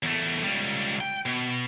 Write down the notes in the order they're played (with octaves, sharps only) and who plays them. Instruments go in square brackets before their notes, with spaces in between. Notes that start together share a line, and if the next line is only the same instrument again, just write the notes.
[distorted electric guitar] E2 A3
C#2 G3
G5
B2